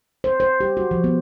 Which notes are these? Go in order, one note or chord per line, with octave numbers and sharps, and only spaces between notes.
C5
C5
G4
F#4
F3
B3